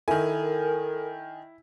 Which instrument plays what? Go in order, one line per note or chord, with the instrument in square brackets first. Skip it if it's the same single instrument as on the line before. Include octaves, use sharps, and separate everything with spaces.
[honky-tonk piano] D#3 G#5 [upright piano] E4 [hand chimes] A4 [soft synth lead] A#4